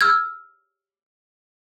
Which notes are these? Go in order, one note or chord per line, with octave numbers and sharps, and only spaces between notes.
E6 F6 G#6